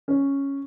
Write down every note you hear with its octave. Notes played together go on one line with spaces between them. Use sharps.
C#4